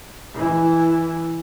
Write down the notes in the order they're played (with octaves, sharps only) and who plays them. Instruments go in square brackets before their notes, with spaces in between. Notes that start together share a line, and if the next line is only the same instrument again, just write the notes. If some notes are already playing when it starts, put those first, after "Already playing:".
[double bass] E3 E4